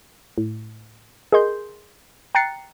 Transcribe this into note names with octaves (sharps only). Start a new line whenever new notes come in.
A2
G#4 A#4 D#5 C6 G6
G5 A#5 F#6 A6 C7 C#7